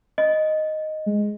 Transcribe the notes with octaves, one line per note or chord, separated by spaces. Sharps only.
D#5
G#3